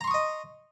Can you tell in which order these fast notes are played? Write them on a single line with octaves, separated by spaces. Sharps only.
A#5 C6 C#6 D#6 D#5